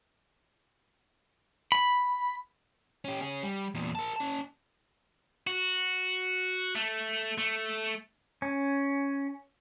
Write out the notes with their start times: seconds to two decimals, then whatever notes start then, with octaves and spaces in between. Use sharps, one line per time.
1.72 B5
3.05 C#4 G4
3.21 C#4 G#4
3.43 G3
3.75 E2 A#2
3.95 A#4 A5
4.16 C#4 A5
5.47 F#4
6.75 A3
7.38 A3
8.42 C#4